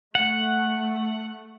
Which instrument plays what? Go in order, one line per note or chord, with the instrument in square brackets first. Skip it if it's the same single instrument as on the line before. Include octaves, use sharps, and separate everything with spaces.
[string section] A3 [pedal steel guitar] F#5